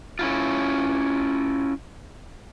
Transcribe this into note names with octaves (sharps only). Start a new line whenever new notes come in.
C#4 E4 F4